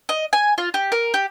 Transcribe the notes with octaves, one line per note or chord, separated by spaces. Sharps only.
D#5
G#5
F4
G4
A#4
G4